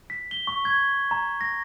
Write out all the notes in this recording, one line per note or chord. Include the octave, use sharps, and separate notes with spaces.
B6
G7
C#6
G#6
A#5
A#6